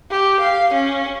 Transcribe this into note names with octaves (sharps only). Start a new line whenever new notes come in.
G4
F5
C#4